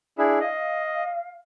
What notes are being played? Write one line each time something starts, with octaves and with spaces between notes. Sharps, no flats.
D4 E4 G#4
D#5 F5